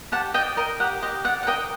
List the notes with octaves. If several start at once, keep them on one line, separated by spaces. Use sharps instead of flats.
G4 F#5 A5
D5 D#5 G5
A#4 D#5
G4 F#5
G4 D#5
D5 F#5
F#5
A#4 D#5 G5